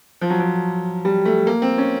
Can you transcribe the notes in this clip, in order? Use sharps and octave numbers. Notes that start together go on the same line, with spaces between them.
F3
F#3
F3
G3
A3
A#3
C4
C#4